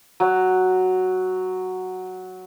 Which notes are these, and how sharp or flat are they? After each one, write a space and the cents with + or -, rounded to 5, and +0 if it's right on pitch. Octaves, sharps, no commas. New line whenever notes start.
F#3 +0